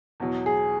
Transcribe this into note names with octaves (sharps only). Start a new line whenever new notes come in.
E2 B2 F#3
G#4